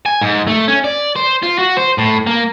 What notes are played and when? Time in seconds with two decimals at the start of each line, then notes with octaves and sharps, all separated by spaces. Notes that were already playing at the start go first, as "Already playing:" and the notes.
0.06 G#5
0.21 G#2
0.48 A3
0.68 C#4
0.84 D5
1.16 C5
1.42 F4
1.58 F#4
1.77 C5
1.98 A2
2.27 A#3